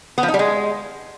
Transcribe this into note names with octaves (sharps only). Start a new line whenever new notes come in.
B3
F3
D#4
G3
G#3